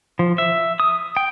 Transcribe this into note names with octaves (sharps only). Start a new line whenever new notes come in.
F3
E5
D#6
G5